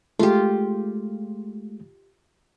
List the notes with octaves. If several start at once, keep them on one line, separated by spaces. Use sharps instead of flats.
G#3 A3 F4 G4